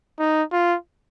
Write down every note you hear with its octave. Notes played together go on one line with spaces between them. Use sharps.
D#4
F4